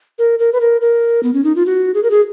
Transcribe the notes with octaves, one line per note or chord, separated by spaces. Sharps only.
A#4
A#4
B4
A#4
A#4
B3
C#4
D#4
F4
F#4
G#4
A#4
G#4